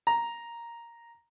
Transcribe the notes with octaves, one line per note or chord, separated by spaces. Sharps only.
A#5